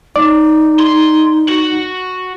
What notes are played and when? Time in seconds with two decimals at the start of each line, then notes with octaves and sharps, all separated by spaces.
0.16 D#4 D5
0.80 C6
1.48 F#4